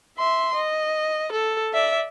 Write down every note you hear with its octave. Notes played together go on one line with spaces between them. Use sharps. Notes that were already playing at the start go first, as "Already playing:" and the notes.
E5 C6
D#5
A4
D5 E5